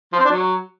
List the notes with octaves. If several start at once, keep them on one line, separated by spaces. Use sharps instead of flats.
F3
C4
D4
F#3